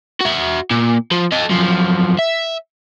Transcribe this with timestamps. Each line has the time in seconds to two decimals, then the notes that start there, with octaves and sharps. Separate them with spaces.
0.21 F#4 E5
0.71 A#2
1.11 F3
1.32 A4 D#5
1.49 F#2 F3
2.19 E5